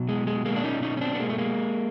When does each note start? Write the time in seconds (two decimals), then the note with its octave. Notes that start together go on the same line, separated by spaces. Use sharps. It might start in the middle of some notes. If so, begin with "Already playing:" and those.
Already playing: B2 F#3
0.09 G#3
0.27 G#3
0.45 G#3 A#3
0.56 D4
0.64 C#4 D#4
0.83 C#4 D#4
0.97 C#4
1.01 C4 D4
1.15 B3
1.20 G#3 A#3
1.30 A3
1.38 G#3 A#3